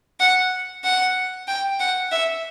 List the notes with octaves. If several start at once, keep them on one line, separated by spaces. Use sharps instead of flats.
F#5
F#5
G5
F#5
E5